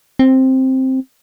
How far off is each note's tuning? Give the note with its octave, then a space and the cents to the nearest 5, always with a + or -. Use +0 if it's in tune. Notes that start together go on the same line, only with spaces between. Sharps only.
C4 +5